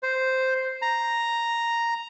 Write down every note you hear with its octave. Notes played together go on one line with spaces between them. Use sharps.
C5
A#5